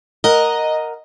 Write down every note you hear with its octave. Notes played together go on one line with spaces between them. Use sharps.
A#4 D#5 F#5